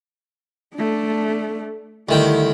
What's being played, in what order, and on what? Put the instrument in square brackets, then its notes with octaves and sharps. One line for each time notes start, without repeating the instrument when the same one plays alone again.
[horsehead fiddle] A3 D4
[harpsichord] D2 D#3 G5 [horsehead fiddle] G3 E4